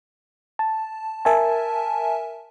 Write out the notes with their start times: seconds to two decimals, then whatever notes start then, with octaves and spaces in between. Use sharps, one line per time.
0.59 A5
1.25 A#4 E5 G#5 A5